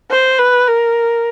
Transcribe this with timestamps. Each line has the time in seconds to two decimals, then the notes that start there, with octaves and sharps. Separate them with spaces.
0.11 C5
0.39 B4
0.68 A#4